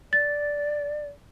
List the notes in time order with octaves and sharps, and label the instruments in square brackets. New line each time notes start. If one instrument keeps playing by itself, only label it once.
[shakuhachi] D5 [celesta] A6